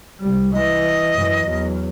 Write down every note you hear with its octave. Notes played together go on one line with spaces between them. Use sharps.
C2 G3
E3 D#5
F#2 E3
E2 F#3